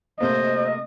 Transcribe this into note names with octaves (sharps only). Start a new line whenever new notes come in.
C3 A3 A#3 C5 D#5